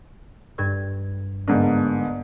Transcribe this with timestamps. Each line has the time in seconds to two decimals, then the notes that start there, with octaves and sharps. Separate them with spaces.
0.58 G2 G#6
1.48 G1 G#2 A#3 D4